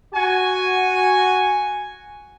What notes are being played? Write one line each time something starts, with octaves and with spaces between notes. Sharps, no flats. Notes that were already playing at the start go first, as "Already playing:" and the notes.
F#4 G#5